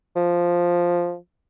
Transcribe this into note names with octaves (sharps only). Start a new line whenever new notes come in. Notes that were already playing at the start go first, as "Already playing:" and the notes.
F3